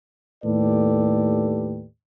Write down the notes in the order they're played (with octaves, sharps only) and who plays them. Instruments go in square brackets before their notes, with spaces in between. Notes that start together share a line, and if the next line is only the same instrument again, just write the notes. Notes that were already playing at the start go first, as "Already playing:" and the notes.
[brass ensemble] D#2 A2 G4 A4 B4 D5